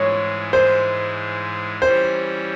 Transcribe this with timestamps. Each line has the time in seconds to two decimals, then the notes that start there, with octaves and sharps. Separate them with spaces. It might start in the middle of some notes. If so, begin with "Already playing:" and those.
Already playing: G#2 E3 G#3 C#5
0.53 C5
1.81 E3 G3 C#4 C5